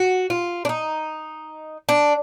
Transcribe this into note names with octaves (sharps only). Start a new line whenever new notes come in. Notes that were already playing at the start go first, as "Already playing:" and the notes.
Already playing: F#4
F4
D4
D#4
D4